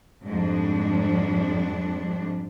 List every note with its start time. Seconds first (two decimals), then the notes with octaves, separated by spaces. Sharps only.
0.23 F2 G#2 G3 D4